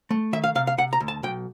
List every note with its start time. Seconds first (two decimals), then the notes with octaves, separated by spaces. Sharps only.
0.11 A3
0.33 D#3 E5
0.44 F5
0.55 C3 F5
0.67 F5
0.78 C3 F#5
0.93 A#5
1.00 D2
1.08 A5
1.23 B1 G5